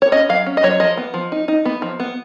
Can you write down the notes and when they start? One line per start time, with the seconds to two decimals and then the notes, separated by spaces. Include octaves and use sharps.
0.02 C#5
0.12 C#4 D#5
0.29 F#3 F5
0.46 C#4
0.57 D#5
0.63 F#3 C#5
0.80 F3 D#5
0.97 B3
1.14 F3
1.32 D#4
1.48 D#4
1.65 B3
1.82 F3
2.00 B3